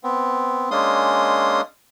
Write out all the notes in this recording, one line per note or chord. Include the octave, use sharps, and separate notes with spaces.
B3 C4
G#3 A#3 C#4 D4 C6 D#6